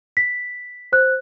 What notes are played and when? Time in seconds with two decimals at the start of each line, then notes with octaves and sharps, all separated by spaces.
0.17 B6
0.92 C5 F#6